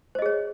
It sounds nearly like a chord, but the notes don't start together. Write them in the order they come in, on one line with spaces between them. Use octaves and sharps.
C5 D#5 G#4 C#5